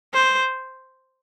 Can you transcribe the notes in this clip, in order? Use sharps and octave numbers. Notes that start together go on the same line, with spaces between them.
C5